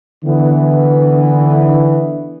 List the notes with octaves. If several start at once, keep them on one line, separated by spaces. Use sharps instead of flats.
D3 E3 B3